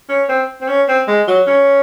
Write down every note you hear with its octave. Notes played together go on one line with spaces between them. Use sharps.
C#4
C4
C4
C#4
C4
G#3
F#3
C#4